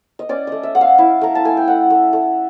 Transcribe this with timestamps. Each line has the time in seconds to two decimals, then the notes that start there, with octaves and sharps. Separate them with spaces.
0.19 D#5
0.29 C#4 D5
0.47 A3 D#5
0.63 E5
0.75 A3 F#5
0.81 F5
0.98 E4
1.21 A3 A#5
1.35 A5
1.45 A3 G#5
1.57 G5
1.67 A3 F#5
1.90 A3
2.13 A3